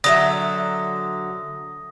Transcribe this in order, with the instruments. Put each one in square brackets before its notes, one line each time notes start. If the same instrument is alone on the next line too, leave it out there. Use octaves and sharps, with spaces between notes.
[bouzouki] D3 F#3 E5 [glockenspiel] D#6 A#6